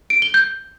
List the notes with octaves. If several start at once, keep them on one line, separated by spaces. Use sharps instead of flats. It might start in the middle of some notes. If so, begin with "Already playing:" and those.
D7
G7
G6